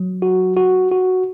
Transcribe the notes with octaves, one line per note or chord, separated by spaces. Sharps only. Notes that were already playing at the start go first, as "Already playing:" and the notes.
Already playing: F#3
F#4
F#4
F#4